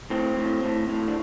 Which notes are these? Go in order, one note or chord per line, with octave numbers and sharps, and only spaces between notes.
A2 C4
A2
A2
A2
D4